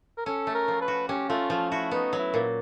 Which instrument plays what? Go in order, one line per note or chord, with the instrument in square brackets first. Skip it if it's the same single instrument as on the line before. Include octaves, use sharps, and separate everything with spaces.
[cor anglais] A#4
[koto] C#4 [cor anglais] A4
[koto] A3
[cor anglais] A#4
[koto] F3
[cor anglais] B4
[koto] F#4
[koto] C#4 [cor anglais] G4
[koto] A3 [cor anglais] F4
[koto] F3 [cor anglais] F4
[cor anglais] E4 [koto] F#4
[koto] B3 [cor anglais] D#4
[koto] F#3
[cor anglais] E4
[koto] A#2